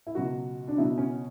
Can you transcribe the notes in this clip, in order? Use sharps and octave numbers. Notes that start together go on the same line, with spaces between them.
E4
C#2 B2 F#3 F#4
D4
C#2 B2 F#3 E4
C#4